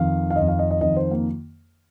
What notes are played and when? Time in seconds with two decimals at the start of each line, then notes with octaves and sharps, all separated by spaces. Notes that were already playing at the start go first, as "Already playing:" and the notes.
Already playing: F2 D#3 F5
0.30 F5
0.36 F2 D#3 D#5
0.48 F5
0.59 D#5
0.71 D#5
0.81 F2 D#3 D#5
0.97 C5
1.11 A#3